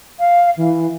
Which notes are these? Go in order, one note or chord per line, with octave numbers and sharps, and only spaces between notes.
F5
E3